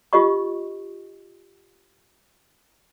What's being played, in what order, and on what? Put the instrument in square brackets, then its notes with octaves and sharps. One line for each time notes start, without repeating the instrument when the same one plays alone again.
[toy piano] F4 G4 D#5 C#6